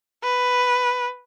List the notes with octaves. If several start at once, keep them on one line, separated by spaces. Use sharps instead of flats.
B4